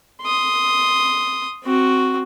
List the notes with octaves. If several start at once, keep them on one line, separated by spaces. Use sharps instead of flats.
C6 D#6
C4 F#4